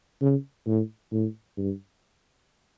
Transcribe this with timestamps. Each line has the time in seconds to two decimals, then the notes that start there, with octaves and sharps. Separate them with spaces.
0.21 C#3
0.67 A2
1.12 A2
1.57 G2